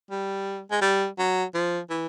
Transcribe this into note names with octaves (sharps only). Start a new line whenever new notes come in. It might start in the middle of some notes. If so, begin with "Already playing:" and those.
G3
G#3
G3
F#3
F3
E3